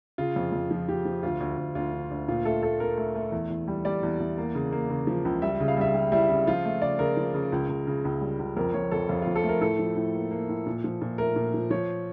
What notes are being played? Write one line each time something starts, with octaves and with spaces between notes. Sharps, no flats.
C#3 F4
F2
F2
F3
F3 G4
F3
D2 F4
D2
D2
D2 F4
D3
D2
A#2 F4
A3 A4
A3 A4
A3 A#4
A3
A3
E2
E2
G3
G3 D5
E2
E2
A#3
C#3
A#3
C#3
F3
C#2
G3 E5
C#3
F5
G3 E5
G3
G3 E4
C#3 E4
F3 F4
A3
C#3 D5
C#3 A#4
F3
C#3
C#2
C#2
C#3
C#2
G3
C#2
F2 A#4
F2 C#5
F2 A4
F2 F4
F4
F2
A4
A3
A#4
A2 A4
F3
A2
A#3
A#3
A2
A#2
F3
A#2
A3 A#4
A#2
F3
F3 C#5